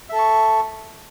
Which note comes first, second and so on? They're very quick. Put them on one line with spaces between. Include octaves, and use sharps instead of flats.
E5 A4 A5 C#6